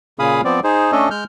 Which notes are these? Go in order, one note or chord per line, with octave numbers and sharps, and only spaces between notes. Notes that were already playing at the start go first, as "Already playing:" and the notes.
A#2 C#3 G#4 F5 B5 D#6
F3 B3 C4 D5
D#4 G#4 C5
A3 C#4 D4 A4 D#5
G#3 F6 G6